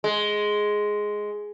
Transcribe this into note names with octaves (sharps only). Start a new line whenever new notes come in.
G#3